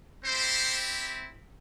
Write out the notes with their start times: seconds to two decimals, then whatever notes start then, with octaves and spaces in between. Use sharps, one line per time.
0.24 C4 E4 G4 C5